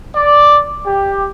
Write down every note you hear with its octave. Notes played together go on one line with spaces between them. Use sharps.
D5
G4